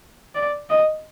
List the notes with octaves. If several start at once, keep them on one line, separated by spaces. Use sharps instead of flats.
D5
D#5